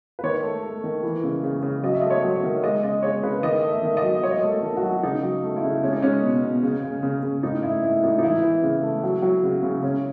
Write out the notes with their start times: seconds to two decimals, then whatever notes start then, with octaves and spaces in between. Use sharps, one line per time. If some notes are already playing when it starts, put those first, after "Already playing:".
0.19 B4
0.23 D#3 C#5
0.43 A3
0.63 A3
0.84 D#3
1.03 E3
1.24 C#3
1.44 C#3
1.63 C#3
1.83 F#3 D#5
1.94 E5
2.01 A3 D#5
2.10 C#5
2.23 F#3
2.36 C#5
2.43 D#3
2.63 G#3 D#5
2.83 C#3 D#5
3.02 G#3 C#5
3.23 C#3 B4
3.43 D#3 D#5
3.63 A3
3.69 E5
3.83 D#3
3.97 D#5
4.03 F#3
4.23 F#3 C#5
4.31 D#5
4.39 A3 C#5
4.50 A4
4.63 D#3
4.77 F#4
4.83 F#3
5.03 C#3 D#4
5.23 F#3
5.43 A3
5.56 E4
5.64 C#3
5.83 G#3 C#4
5.93 D#4
6.02 G#3 C#4
6.22 B2
6.43 B2
6.63 C#3
6.83 C#3
7.03 C#3
7.23 C#3
7.43 A2 D#4
7.63 A2 E4
7.82 A2 E4
8.02 A2 D#4
8.19 D#4
8.23 E3 E4
8.43 E3
8.63 C#3
8.83 A3
9.03 F#3
9.22 F#3
9.43 C#3
9.63 C#3
9.82 C#3 C#4